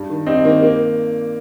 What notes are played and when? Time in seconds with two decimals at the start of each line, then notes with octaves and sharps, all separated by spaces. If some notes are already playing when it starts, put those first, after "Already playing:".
Already playing: G2
0.10 D#3
0.26 G2 C4 D#4
0.45 D#3 A#3
0.63 A#3